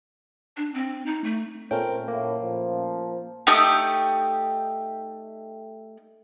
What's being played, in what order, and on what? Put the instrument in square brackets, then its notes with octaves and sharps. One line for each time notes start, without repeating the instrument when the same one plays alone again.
[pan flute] D4
C4
D#4
A3
[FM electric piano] A#2 A3 C#4 [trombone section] C4 [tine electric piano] A#4 G5
[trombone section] F#2 A2 [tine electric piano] A#3
[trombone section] F3
[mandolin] A3 D#4 G4 D#6